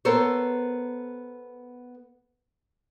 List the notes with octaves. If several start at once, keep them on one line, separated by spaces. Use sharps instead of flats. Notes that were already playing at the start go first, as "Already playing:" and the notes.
B3 A4 A#4 C5 C#5